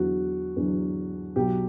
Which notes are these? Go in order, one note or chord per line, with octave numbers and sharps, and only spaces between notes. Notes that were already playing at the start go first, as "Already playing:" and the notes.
Already playing: E2 D3 F#3 F#4
E2 D3 F#3
B1 B2 F#3 G4